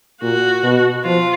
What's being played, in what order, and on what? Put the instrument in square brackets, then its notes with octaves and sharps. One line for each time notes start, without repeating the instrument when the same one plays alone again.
[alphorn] A#2 [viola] F#4
[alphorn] B2
[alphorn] F3 [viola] F4